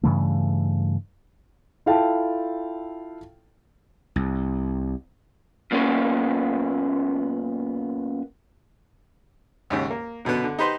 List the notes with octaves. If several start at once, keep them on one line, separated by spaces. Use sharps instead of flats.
G2 C#3 E3 A3
E4 F4 A4 F5 G5 A5
C2
F#2 A#2 A#3 B3 C#4
D#2 G#2 C#3
A#3
F#2 B2 D3 B3
D3
D#4 G4 B4 C5 C6